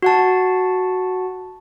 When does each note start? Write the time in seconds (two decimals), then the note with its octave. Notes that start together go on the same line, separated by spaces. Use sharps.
0.02 F#4 F#5 A5